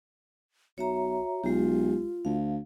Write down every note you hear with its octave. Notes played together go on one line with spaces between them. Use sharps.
B1 F#4 C#5 E5 A#5
B1 G#3 F4 G4
D2 F5